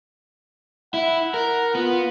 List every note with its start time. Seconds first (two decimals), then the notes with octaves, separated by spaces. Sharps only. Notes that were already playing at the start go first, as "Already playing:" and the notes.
0.94 E4 F#5
1.34 A#4
1.75 B3 F4